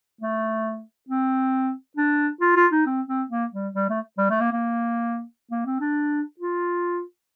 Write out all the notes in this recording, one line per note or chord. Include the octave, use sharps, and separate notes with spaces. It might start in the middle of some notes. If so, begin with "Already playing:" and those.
A3
C4
D4
F4
F4
D#4
C4
C4
A#3
G3
G3
A3
G3
A3
A#3
A#3
A#3
C4
D4
F4